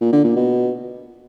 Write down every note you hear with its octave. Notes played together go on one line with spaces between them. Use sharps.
A#2
D3
A#2
B2